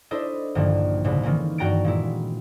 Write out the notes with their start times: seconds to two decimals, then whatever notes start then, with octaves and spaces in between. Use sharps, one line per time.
0.11 D4 E4 A4 C5 D#5
0.55 A#1 G2 D3 D#3 F3
1.04 C2 A2 C#3
1.23 D#3 E3 A#3 C4 C#4
1.58 G2 F#4 G5 A#5 A6 D7
1.85 A#2 G#3 E4